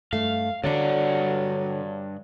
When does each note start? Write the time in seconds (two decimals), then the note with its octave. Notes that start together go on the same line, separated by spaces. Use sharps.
0.13 G2 A3 F5
0.64 G2 D3 F#3 D4 D5 F#5